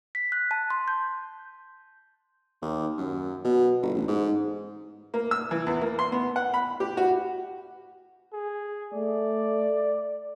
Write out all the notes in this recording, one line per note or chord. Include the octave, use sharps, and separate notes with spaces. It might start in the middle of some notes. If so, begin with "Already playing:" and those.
B6
F#6
A5
C6
G6
D#2
F#2
B2
G1
A1
G#2
A#3
E6
E3
E2
A#3
C6
B3
F#5
B5
G4
F#4
G#4
A3 D5